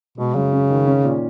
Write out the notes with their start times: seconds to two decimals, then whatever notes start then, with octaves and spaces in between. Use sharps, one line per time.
0.18 B2 G#3
0.35 F#2 C#3
0.52 C#4
0.69 D#3
0.87 C#4
1.04 A#2